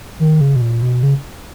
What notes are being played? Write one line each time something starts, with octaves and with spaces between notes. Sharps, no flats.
D#3
C#3
B2
A#2
B2
C#3